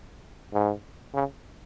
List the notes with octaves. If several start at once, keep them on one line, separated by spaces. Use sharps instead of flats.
G#2
C#3